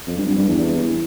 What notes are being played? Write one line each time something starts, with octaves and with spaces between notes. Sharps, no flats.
F2
G2
G2
G2
E2